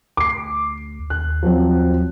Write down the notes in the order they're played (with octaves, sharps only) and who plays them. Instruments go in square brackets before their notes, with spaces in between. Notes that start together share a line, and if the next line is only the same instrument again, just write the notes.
[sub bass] D2 [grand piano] D6 C7
[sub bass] D#2 [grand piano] F#6
[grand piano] F3 F#3 C4